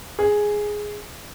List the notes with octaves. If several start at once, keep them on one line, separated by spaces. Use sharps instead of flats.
G#4